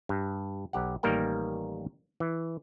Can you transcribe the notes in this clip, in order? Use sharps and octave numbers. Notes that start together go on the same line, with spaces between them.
G2
B1 G4 F#5
A1 D#3 G3 A#3 A#4 G5
E3